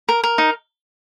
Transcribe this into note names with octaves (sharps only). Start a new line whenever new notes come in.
A#4
A#4
D#4